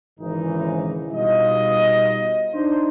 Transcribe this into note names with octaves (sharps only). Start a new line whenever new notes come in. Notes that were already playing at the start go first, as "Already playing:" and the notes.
G#1 C#3 E3 D#4
B2 G3 D#4 F4 D#5
D4 D#4 C5